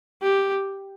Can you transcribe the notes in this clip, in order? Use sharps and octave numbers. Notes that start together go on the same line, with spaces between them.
G4